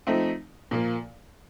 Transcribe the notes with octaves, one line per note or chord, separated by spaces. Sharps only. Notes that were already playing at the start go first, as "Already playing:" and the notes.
F3 A3 C4 D#4
A#2 F3 A#3